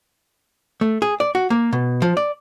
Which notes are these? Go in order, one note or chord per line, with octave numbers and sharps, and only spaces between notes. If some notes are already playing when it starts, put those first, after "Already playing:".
A3
G#4
D5
F#4
A#3
B2
F3
D5